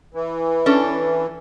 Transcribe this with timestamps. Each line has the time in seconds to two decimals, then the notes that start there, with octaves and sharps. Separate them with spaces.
0.14 E3
0.66 C#4 D4 A4